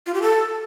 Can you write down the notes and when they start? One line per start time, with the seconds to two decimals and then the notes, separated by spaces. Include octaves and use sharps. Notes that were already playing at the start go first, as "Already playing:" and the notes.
0.07 F4
0.14 G4
0.22 A4